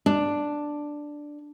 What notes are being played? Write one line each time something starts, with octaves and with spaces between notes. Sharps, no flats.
D4